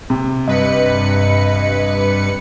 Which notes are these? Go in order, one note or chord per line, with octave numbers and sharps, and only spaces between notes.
C3
G2 B4 D#5 C#7